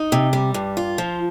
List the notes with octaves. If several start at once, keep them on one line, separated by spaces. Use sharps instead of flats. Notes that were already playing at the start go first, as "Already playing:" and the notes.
Already playing: D#4
C3
G3
G2
F4
F3